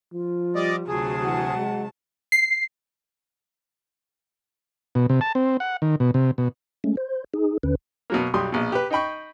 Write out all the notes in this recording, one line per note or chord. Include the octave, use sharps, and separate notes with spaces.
F3 F4
G3 D5 D#5
D2 C3 F#3 G#4 A5
E3 F#5
G#3
C7
B2
C3
A5
C4
F#5
D#3
B2
C3
B2
G#3 A3 C#4
C5
D#4 G#4
D#2 D3 C#4 B4
B2 F#3 A#3
B1 F#3 G3 C6 D#6
A#1 B2
G4 B4
D#4 D#5 G5 B5 C#6